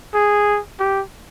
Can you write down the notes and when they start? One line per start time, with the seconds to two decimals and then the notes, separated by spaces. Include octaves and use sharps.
0.14 G#4
0.80 G4